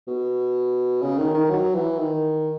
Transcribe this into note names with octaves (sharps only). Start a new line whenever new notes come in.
B2
C#3
D#3
D#3
F#3
E3
D#3